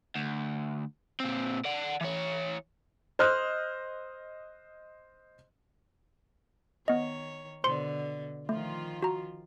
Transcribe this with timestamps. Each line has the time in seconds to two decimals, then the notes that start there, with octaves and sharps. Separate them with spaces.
0.15 D2
1.20 A#2 C4
1.65 D5 F#5
2.01 E3 C#5
3.19 C5 D#5 D#6 F6 F#6
6.88 D#3 B3 C#5 D#5
7.64 B2 D3 C5 C6 C#7
8.49 D#3 F3 A3 F4
9.02 F#4 A#5